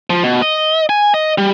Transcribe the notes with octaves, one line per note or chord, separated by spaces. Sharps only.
F3
B2
D#5
G#5
D#5
G3